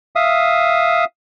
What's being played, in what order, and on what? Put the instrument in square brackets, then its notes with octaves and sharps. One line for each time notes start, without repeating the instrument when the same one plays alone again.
[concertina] E5 F5 D#6